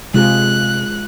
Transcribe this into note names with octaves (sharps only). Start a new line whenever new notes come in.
C3 G#3 F4 G#4 F#6